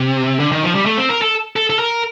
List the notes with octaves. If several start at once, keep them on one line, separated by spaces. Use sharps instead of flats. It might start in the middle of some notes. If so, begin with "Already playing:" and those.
Already playing: C3
D3
D#3
F3
G3
A3
C4
A#4
A4
A4
A4
A#4